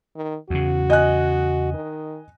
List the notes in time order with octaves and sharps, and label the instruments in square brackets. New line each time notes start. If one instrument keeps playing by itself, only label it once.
[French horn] D#3
[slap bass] E2 C#3 [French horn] F#4
[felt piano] D#5 G#5 F#6
[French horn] D#3